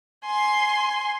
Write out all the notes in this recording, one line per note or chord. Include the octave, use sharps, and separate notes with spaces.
G#5 C6